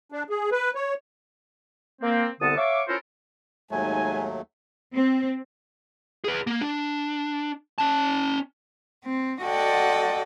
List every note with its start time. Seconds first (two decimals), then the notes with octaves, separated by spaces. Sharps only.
0.12 D4
0.30 G#4
0.52 B4
0.75 C#5
2.02 A#3 C4
2.41 C2 D3 B3 F#5 A5 D#6
2.57 C#5 E5 F5 C#6 D6
2.88 C#4 E4 F4 A4 A#4 C5
3.71 D#2 G#2 F#3 A3 G#5
4.94 C4
6.24 G#4 B4
6.47 A#3
6.61 D4
7.78 C#4 A5
9.04 C4
9.41 F#4 A4 D5 D#5 F#5 G5